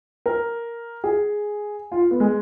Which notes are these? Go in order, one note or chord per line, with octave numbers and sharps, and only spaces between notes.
A#4
G#4
F4
B3
G#3